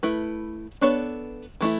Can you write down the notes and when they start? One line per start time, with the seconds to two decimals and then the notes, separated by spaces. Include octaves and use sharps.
0.03 A3 E4 B4
0.81 B3 D4 A4 C#5
1.61 E3 A3 E4